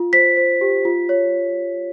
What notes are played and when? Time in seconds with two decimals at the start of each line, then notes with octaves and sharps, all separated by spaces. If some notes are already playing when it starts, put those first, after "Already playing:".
Already playing: F4
0.13 C5 B6
0.37 C5
0.61 G4
0.85 F4
1.09 C#5